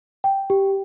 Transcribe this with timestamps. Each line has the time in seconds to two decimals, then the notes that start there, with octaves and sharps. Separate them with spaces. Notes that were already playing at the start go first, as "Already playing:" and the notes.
0.24 G5
0.50 G4